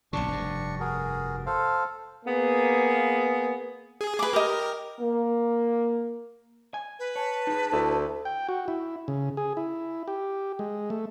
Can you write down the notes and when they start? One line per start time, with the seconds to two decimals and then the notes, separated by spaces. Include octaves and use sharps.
0.13 B1 A#2 C#3 D4 C#6
0.28 F1 G2
0.80 F#4 G#4 A#4
1.46 A4 C5 F5
2.26 A#3 B3 G#4
4.01 G#4
4.19 B4 D6
4.33 G4 A#4 D#5
5.00 A#3
6.74 G#5
6.99 B4
7.16 C#5 A5
7.47 D#4 G#4
7.72 D2 E4
8.25 G5
8.49 F#4
8.68 E4
9.08 C#3
9.37 G#4
9.57 E4
10.08 G4
10.59 G#3
10.90 A3